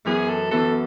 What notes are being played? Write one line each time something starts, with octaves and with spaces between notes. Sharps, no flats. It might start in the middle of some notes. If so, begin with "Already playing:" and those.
F#2 E3 B3 F#4 G#4
A4
F#2 E3 B3 F#4 A4